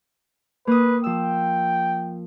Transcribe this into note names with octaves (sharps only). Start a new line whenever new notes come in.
A#3 B4 D#6
F3 G5 E6